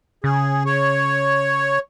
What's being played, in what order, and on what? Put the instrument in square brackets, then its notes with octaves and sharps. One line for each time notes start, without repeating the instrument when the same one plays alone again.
[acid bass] C#3 [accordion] G#4
[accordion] C#5